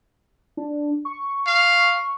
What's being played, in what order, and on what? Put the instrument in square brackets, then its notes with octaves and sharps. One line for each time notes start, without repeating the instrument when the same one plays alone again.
[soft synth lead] D4
C#6
[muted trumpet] F5